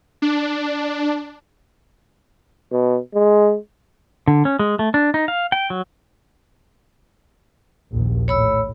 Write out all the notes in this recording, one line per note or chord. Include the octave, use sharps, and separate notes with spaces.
D4
B2
G#3
D3
C#4
G#3
A3
D4
D#4
F5
G5
F#3
A#1 D#2
A2 C#5 B5 E6